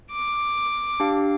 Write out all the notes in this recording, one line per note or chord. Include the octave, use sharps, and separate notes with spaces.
D6
D4 G4 F5